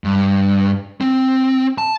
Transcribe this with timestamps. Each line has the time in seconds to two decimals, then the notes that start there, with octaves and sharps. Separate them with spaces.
0.04 G2
1.01 C4
1.78 A5